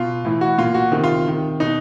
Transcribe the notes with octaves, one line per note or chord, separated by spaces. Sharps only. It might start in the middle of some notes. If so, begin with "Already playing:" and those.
Already playing: B2 F4
A2 E3
F#4
A#2 F4
F#4
C3 D#3
F4
C3 D#3
B2 D#4